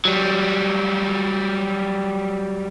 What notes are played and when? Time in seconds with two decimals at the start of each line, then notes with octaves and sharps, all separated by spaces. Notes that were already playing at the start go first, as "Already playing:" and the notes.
0.05 F#3 G3